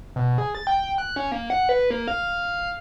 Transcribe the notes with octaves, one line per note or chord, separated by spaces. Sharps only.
B2
G#4
A6
G5
F#6
C#4
A#3
F#5
B4
A#3
F5